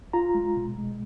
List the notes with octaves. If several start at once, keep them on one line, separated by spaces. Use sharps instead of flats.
F4 A#5
G#3
B2
G#3